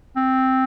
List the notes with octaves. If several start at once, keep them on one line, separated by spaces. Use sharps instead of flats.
C4